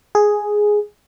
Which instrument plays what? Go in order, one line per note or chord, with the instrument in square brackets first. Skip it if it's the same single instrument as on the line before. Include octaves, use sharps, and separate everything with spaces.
[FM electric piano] G#4